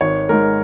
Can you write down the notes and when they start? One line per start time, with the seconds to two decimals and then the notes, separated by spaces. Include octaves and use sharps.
0.01 G#1 C#5
0.29 G#2 G#3 A#4